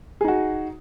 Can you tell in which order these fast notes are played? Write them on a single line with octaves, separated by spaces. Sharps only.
G#4 D#4 F#4